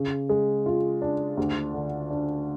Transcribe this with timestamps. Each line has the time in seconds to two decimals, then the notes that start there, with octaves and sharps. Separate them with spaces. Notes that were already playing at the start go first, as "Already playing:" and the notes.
Already playing: C#3
0.29 G#3
0.66 F4
1.02 D4
1.37 D2
1.74 D3
2.10 D4